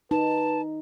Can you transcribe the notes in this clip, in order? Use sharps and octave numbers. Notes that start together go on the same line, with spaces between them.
D#4 B4 A5